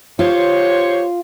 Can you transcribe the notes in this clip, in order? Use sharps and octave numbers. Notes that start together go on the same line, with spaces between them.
F4 G4 C5 C#5